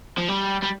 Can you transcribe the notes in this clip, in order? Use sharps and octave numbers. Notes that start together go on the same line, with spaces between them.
F3
G3
G3